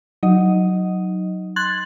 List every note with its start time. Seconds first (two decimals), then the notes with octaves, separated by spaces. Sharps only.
0.23 F#3 D#4 D#5
1.56 C6 F#6 G#6 A6 F#7